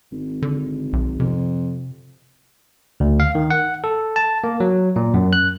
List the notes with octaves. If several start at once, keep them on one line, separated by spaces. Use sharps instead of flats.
G#1
D3
B1
F2 C3
D2
F5
D#3
F#5
A4
A5
A#3
F#3
A#2
F#2
F#6